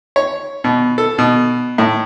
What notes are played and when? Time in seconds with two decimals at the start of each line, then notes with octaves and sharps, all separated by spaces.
0.16 C#5
0.64 B2
0.98 A4
1.18 B2
1.78 A2